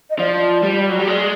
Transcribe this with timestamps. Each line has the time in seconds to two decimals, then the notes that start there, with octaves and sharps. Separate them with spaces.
0.10 D#5
0.19 F3 D5
0.64 G3
0.90 F#3
1.00 G3
1.08 G#3 D5